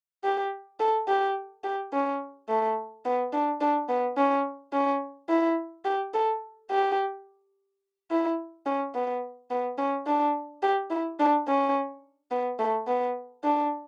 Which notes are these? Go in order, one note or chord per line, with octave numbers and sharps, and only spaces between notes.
G4
A4
G4
G4
C#4
A3
B3
D4
D4
B3
C#4
C#4
E4
G4
A4
G4
E4
C#4
B3
B3
C#4
D4
G4
E4
D4
C#4
B3
A3
B3
D4